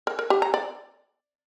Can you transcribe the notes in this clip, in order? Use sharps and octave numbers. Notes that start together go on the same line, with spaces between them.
A#4
A#4
G4
A#5
D5